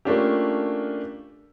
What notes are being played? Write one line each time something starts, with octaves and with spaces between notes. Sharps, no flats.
A3 A#3 C#4 D4 F4 G4